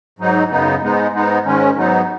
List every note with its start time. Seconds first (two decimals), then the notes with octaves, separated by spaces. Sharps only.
0.19 G#2 F#3 D#4
0.50 F#2 C#3 B3 D#4
0.82 G#2 G#3 B3 D#4
1.14 G#2 G#3 B3 D#4
1.45 G#2 D#3 G#3 C#4
1.76 G#2 F#3 B3 D#4